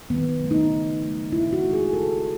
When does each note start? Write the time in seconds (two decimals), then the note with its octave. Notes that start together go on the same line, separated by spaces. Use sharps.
0.10 D#3 B3
0.40 F#3 A3
0.51 D#4
0.71 C#3
1.02 F#3 A3
1.32 C#3 E4
1.53 F#4
1.63 G#3
1.73 G#4
1.93 C#3 A4